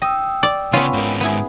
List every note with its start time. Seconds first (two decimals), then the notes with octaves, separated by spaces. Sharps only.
0.02 D#5 G5 D#6 E6
0.43 D5
0.73 C#3 B3 C#4 F4
0.93 G#2 A#4
1.21 B3 E4 G#4